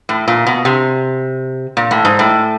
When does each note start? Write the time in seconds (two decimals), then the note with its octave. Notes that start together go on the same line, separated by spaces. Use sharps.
0.09 A2
0.28 A#2
0.47 B2
0.65 C3
1.77 A#2
1.91 A2
2.05 G#2
2.19 A2